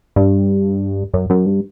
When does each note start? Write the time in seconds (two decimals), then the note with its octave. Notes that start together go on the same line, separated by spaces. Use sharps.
0.16 G2
1.13 F#2
1.30 F#2
1.46 G2